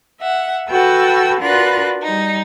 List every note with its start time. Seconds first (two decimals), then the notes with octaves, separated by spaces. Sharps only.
0.20 E5 F#5
0.71 F#4 A4 B4 F#5 G5 E6
1.41 D4 F4 F#4 A#4 B4 F#6
2.03 G3 D#4